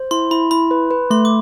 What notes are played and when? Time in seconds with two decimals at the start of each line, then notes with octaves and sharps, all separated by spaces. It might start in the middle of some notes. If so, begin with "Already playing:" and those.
Already playing: C5
0.11 E4 C6
0.31 E4 B5
0.51 E4 B5
0.71 B4
0.91 B4
1.10 A3 C6
1.25 D6